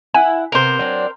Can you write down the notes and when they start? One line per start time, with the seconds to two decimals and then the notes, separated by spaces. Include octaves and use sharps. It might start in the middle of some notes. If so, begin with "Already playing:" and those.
0.14 E4 E5 F#5 G#5
0.52 C3 B3 A#4 C5
0.79 F#3 C4 D4